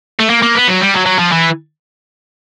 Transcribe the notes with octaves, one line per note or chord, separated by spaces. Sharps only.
A3
A#3
A#3
B3
F#3
G3
F#3
F#3
F3
E3